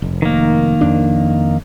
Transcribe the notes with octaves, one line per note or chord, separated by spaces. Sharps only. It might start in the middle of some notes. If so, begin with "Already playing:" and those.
F1
D#3 A#3
F2 D4